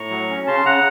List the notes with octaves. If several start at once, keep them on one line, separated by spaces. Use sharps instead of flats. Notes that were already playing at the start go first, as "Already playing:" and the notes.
Already playing: A2 A#5 C#6
F#3
C#4
C#3 A5 C6
C#3 F#5 A#5